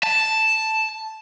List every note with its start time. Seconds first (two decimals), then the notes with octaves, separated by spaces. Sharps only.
0.03 A5